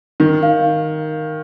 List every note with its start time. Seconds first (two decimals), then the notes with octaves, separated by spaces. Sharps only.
0.20 D#3 A#4
0.43 F5